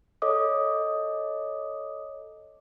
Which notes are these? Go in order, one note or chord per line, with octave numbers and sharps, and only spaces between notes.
A4 C#5 D#5 D6 D#6